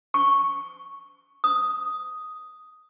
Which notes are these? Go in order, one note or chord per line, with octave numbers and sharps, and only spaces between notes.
C#6
D#6